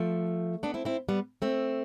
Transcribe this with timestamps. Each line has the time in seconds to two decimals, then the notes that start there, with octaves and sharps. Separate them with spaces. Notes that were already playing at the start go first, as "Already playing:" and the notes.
Already playing: F3 A3
0.63 B3 D4
0.74 C4 E4
0.85 C4 E4
1.09 G3 B3
1.42 A3 C4